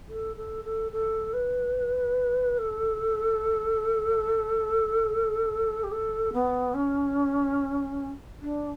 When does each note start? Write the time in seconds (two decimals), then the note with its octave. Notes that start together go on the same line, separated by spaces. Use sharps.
0.09 A4
0.36 A4
0.64 A4
0.92 A4
1.33 B4
2.58 A4
5.83 G4
5.92 A4
6.33 B3
6.74 C#4
8.41 D4